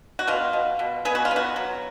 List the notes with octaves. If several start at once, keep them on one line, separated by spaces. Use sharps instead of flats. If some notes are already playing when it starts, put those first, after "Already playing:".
F#4
B2 F4
B2
B2
B3 G#4
F#4
F4
B3
F#4
F#3